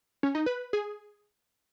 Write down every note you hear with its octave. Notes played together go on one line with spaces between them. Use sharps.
C#4
D#4
B4
G#4